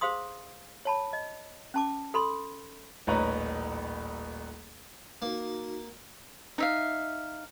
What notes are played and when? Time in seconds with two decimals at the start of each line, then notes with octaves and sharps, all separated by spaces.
0.01 G#4 C5 F5 C6 D#6
0.85 C#5 A5 B5
1.13 D#5
1.74 C#4 A5 D6
2.14 A4 B5 C6
3.07 D#1 A1 D#4 B4 C#5 A#5
5.22 A#3 D#4 F#4
6.58 D#4 E5 F5